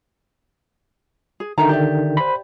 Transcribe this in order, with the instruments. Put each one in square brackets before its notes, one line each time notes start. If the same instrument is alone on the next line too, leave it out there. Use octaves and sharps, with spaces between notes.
[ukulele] G#4
[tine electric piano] D3 D#3 [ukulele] E5 A5 A#5
[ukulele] G4 D5 E5
[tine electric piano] C5 B5